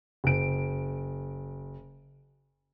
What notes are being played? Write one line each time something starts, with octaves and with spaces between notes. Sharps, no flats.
F#1 D7